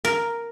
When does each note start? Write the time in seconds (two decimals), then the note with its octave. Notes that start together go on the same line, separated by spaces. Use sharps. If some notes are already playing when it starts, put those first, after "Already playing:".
0.05 A#4